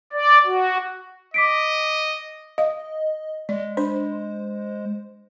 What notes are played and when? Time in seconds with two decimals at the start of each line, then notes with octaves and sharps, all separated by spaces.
0.13 D5
0.46 F#4
1.34 D#5 D6 B6 D7
2.58 D#5 F5
3.49 G#3 D5
3.77 D4 C5